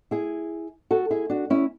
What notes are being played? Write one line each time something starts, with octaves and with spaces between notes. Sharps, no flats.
E4 G#4
F#4 A4
E4 G#4
D4 F#4
C#4 E4